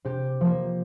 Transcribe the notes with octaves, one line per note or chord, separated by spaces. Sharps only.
C3 G4
F3 A#3